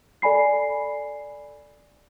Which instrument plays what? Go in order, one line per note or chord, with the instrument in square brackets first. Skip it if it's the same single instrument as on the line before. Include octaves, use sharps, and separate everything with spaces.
[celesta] A4 D5 G#5 B5 C7